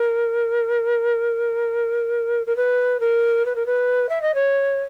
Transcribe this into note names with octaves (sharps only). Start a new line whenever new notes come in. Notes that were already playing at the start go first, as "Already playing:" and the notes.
Already playing: A#4
A#4
B4
A#4
B4
A#4
B4
E5
D#5
C#5